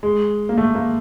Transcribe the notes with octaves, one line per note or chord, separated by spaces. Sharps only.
G#3
A#3
A3
A#3